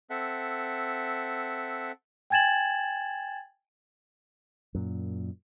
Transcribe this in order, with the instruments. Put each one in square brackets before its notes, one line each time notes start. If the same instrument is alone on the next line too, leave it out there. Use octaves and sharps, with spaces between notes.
[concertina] C4 A4 E5 F#5
[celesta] G5 G#5 G#6 A6 E7 F#7
[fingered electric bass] F#2 A#2